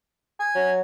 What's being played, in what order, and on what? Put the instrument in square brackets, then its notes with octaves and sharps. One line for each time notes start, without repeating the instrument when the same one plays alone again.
[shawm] G#5
[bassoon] F#3